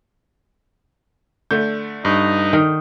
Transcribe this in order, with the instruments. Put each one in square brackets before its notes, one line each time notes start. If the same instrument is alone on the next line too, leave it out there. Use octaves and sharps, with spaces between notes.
[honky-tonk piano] D3 A3 [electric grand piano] G6
[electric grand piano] G2 [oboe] D#4
[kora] D#3